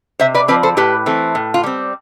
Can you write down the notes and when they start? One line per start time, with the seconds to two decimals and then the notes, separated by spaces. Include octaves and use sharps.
0.20 C3 C5 E5
0.34 B4 D5
0.48 F3 C4 B4 D5
0.63 A4 C5
0.77 A2 G4 B4
1.06 E3 A3 C4
1.35 A2
1.54 F4
1.63 G3 C4